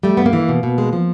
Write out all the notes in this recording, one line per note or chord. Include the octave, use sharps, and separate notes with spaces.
G3 A3
G2 B3
A#3
E3
B2
B2
G#3
F3